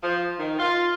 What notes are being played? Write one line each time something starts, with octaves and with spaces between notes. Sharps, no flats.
F3
D#3
F4